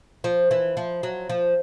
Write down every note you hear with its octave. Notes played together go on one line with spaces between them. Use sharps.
F3
E3
F3
F#3
F3